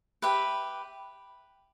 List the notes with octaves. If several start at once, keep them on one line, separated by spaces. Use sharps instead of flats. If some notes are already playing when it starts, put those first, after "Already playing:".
G4 B4 E5